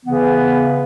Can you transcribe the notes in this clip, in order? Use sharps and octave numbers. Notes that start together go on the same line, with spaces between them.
C#3 E3 B3